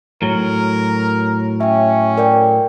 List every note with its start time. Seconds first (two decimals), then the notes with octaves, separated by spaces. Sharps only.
0.22 A2 F#3 A#4
1.61 C#4 E5 G5
2.17 A#4 D5 G5